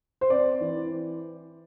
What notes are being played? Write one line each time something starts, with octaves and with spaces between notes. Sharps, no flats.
C5
C4 D5
E3